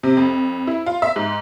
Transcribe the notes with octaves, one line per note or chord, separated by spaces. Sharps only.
C3
F2
E4
F4
E5
G#2